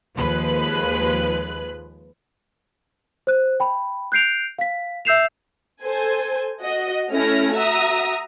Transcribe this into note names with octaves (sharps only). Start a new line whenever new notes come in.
D#2 F3 G#3 B4 F#6
C5 F#6
G5 B5
F#6 G6 C7 D7 F7
F5 B6
E5 E6 G6 C7 E7 F7
A4 C5 G#5
F#4 D#5
A3 C#4 E4 F6 A#6
F#4 E5 A#5 D#6